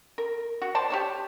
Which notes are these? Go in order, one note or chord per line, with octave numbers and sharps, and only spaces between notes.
A#4
F#4
C5 D5 A5
G4 C#5 A5